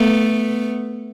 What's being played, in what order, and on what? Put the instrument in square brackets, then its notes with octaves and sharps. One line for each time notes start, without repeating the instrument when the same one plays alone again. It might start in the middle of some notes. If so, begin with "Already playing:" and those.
Already playing: [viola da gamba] A3 B3